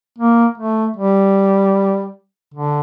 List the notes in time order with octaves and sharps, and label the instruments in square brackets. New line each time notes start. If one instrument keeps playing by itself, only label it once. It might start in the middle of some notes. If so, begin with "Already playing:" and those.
[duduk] A#3
A3
G3
D3